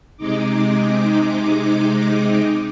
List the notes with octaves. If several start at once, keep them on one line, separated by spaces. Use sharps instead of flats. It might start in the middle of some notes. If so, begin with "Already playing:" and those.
C3 G#3 D#4 D6